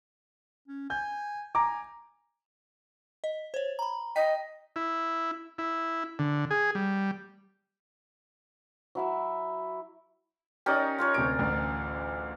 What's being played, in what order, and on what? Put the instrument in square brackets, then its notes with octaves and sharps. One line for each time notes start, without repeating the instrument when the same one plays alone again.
[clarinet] C#4
[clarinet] G#5 [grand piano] G6
[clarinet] G#5 [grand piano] A#5 D6
[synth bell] D#5
C5 C#5
A#5 B5
[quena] D#5 [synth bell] G5 B6
[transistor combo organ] E4
E4
D3
G#4
G3
[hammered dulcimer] F#3 E4 E5
[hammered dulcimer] C#4 D#4 A#4 [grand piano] G4 D5 D#5
[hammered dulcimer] F4 A#4 C#5
[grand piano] D2 C3 D7 [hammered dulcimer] D5
[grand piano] A1 D2